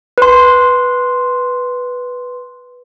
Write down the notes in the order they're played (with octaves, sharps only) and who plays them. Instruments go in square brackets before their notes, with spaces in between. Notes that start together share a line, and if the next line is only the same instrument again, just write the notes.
[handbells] B4 C6